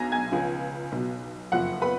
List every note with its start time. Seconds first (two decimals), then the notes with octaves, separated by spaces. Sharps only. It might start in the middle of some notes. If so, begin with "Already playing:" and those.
Already playing: B1 B2 G#5 A#5 G#6 A#6
0.12 G#5 G#6
0.32 C#2 C#3 F3
0.92 B1 B2
1.52 F#1 F2 F3 F#5 F#6
1.82 B4 B5